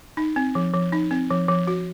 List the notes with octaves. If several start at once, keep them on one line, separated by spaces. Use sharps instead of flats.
D#4
C4
F3
F3
D#4
C4
F3
F3
F#4